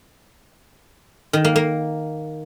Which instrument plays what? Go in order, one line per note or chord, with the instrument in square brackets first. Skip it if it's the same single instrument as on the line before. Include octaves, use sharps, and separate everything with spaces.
[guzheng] D#3
A#3
A#3